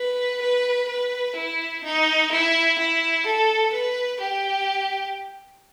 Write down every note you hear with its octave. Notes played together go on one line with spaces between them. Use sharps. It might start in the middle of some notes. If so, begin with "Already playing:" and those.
Already playing: B4
B4
B4
E4
D#4
E4
E4
A4
B4
G4